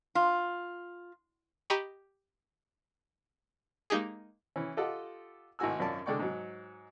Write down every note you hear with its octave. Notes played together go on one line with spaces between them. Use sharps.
F4
G4 D#5 A#5 B5 C#6
G#3 A#3 D#4 G4 G#4
E3 C#4
F4 G4 A4 D#5 F#5
G#1 A2 F#4 G#5 E6
G#1 F#2 C#4 F4 D5 A5
D3 G#3 D5 G5 C#6
G#2 F#3